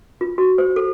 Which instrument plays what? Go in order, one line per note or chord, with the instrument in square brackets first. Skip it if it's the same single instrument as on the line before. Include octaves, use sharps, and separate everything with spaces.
[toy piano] F4
F#4
C5
A4